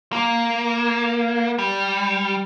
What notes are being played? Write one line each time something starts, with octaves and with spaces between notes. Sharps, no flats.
A#3
G3